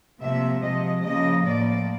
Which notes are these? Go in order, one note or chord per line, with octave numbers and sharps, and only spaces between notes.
C3 F3 A#3 E5
C3 F3 G#3 D#5
C#3 F3 A#3 D#5
A2 F3 A#3 D5